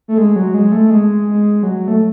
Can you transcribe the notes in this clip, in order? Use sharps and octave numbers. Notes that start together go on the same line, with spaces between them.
A3
G#3
F#3
G#3
A3
G#3
G#3
F#3
A3